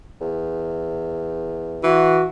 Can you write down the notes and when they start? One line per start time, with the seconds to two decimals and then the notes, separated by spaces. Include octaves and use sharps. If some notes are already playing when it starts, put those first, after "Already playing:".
0.21 E2
1.84 E3 F#4